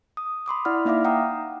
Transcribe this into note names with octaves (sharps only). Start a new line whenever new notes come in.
D#6
B5 C6 D6 D#6
E4 D5 F#5 B5 F6
A#3 D#4 E5 F5 D6 F6
F#5 G5 A#5 D#6